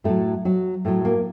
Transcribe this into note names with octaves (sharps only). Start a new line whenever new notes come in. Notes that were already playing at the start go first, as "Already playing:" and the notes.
A2 F#3 A3 A4
F#3 F#4
A2 F#3 A3
A#3